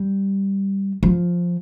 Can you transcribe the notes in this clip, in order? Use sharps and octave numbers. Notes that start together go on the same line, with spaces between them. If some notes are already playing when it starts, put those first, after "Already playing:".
Already playing: G3
F3